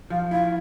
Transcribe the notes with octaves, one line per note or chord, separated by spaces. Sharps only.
F3 F5
E4 F5